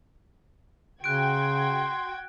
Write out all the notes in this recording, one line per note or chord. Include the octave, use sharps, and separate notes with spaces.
C#3 F#4 G5 C6 F#6 G#6 D7